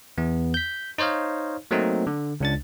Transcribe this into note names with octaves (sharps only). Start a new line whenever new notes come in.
E2 B3
G6 B6
D#4 C5 C#5 D#5 F5
F#3 A3 A#3 C4 D#4
D3
C#2 D4 A6